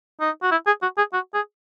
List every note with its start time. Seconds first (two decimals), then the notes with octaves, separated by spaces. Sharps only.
0.20 D#4
0.43 F#4
0.51 E4
0.67 G#4
0.82 F#4
0.98 G#4
1.13 F#4
1.34 G#4